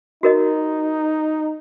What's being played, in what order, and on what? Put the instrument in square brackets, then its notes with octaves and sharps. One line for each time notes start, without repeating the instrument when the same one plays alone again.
[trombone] D#4 [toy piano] F#4 A#4 D#5